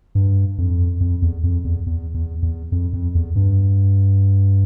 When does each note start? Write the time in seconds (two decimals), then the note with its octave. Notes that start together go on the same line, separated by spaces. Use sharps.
0.15 G2
0.58 F2
1.00 F2
1.22 E2
1.43 F2
1.64 E2
1.86 E2
2.14 E2
2.42 E2
2.72 F2
2.93 F2
3.15 E2
3.36 G2